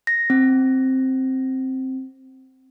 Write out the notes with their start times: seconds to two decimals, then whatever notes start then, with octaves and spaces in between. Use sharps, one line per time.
0.07 A#6
0.30 C4